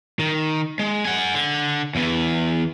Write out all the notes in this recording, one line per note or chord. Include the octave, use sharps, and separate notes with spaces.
D#3
G#3
F#5 G#5
D3
E2 E3